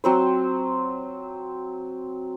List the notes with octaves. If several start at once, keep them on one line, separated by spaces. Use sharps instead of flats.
F#3 C4 C5